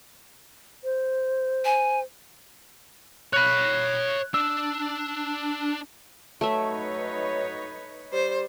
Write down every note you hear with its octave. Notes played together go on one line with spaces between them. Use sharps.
C5
G#5
C#5 B5 F#6
D4 E6
F#3 A3 D#4 B4 C#5 E5
G3 C5